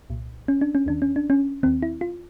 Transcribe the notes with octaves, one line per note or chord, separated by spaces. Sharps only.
C2 A#2
C#4
D4
C#4
D#2 D#3 D4
C#4
D4
C#4
D#2 D#3 C4
E4
F4